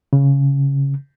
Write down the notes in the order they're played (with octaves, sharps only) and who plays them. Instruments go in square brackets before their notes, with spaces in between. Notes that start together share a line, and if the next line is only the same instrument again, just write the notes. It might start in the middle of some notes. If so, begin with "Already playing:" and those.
[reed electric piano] C#3